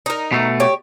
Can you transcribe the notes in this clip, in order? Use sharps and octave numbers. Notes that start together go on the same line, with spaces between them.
D#4 A#4
B2 A3
G4 C#5